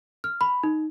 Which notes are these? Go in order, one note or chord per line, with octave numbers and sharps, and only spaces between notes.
F6
B5
D#4